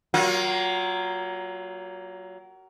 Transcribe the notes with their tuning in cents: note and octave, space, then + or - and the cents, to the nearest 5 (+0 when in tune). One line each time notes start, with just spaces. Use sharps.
F#3 +30 A#3 +0 F4 +45